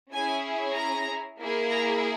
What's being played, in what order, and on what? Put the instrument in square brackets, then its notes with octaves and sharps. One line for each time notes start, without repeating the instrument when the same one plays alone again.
[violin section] C#4 E4 G#4 G#5
A#5
A#3 E4 G#4
A#5